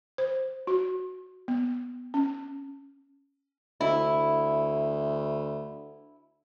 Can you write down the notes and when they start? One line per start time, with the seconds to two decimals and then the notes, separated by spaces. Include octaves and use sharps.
0.18 C5
0.67 F#4
1.48 B3
2.14 C#4
3.81 D2 E4